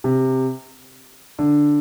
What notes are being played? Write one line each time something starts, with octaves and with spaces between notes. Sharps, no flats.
C3
D3